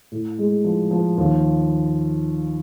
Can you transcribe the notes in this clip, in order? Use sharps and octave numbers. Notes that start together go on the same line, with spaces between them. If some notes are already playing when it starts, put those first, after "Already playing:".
A2
G#3
F3
F3
D#2